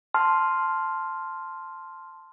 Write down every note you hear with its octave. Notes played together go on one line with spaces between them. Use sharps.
A5 C6 F6